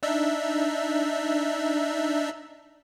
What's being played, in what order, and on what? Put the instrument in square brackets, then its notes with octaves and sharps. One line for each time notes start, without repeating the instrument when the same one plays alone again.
[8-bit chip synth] D4 D#4 E5